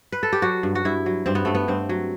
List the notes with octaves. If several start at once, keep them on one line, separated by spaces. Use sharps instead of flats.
B4
A4
G4
F#3 F#4
G2
F#4
G2 E4
F#3
G2 C4
B3
G2 A3
B3
G2 C4
F#3